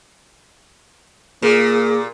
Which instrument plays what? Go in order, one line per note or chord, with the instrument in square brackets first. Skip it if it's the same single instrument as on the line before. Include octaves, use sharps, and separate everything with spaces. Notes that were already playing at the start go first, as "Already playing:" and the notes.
[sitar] A#2 [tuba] A#3 [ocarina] G#4